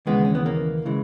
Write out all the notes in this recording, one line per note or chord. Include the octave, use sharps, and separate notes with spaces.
D#2 C#3 E3 G#3 B3
C#4
B3
A#3
C#3 E3 G#3